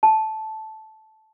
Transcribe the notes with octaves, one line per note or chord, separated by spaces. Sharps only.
A5